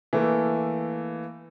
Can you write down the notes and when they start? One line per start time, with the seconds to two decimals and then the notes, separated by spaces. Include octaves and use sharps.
0.13 E3 A3 A#3